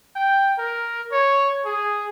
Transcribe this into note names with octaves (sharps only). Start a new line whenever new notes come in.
G5
A#4
C#5
G#4